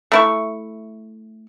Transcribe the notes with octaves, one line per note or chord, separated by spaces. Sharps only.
A3 E4 C#6